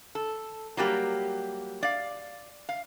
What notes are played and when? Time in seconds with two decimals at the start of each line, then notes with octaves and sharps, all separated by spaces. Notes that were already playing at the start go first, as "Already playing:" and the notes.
0.15 A4
0.77 F#3 G3 A#3 G4
1.83 D5 F5
2.69 F5